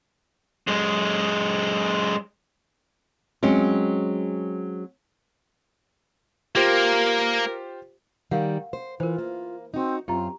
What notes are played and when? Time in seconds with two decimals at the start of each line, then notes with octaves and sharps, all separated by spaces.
0.67 F#2 G#3
3.43 F#3 G#3 C4 C#4
6.55 A#3 F4 G4 A#4 C5
8.31 D#3 G3 A#4 F5 F#5
8.73 C5
9.00 E3 F4 A#4 C5
9.18 A#3
9.74 C4 D#4 F#4
10.08 F#2 C4 E4 F4 G4